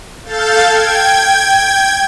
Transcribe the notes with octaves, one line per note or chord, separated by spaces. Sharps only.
A4 F5 G6 A6
G5 G#6